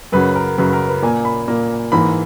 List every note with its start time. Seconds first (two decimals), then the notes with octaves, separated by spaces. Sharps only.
0.12 F#2 C#3 F#3 B4
0.36 A#4
0.58 F#2 C#3 F#3 B4
0.73 A#4
0.88 B4
1.02 A#2 A#3 G#5
1.25 B5
1.48 A#2 A#3
1.92 G#2 E3 A#3 B5